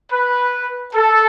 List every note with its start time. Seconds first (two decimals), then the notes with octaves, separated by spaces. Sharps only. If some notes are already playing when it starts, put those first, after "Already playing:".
0.12 B4
0.95 A4